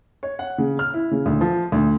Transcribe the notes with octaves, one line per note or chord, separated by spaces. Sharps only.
C#5
F#5
C#3
F6
E4
C#3
D2
F3
D2